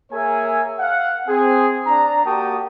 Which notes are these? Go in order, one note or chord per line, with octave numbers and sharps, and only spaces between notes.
A#3 G#4 A#4 C#5 E5 G#5
F5 F#5
C4 G#4
D4 A#5
A#3 F#4 G4 G5 A5 D#6